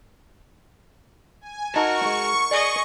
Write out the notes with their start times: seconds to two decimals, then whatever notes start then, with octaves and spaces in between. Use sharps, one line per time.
1.41 G#5
1.74 D#4 F#4 A#4 A5 C#6
2.05 G#3
2.51 G#4 D5 D#5